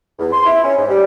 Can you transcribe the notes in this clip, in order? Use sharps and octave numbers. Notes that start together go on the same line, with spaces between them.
E2
C6
E4
C#4
G#2
G3